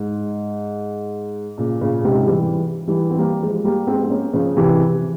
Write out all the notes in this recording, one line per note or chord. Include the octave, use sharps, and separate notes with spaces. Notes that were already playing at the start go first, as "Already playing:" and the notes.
Already playing: G#2
A#2 C#3
A#2 C#3
G#2 C3
E3 G3
E3 G3
C4
G3 A#3
F3 G#3
G3 A#3
G#3 C4
C4
A#3 C#4
C#3 F3
C3 E3